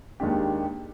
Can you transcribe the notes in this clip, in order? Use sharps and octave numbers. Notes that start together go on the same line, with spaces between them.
D#2 D#3 G#3 D4 G4